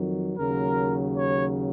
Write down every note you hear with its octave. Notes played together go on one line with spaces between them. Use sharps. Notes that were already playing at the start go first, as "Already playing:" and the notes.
Already playing: F2 D#3 F#3
D#2 C#3 F#3 A#4
C#5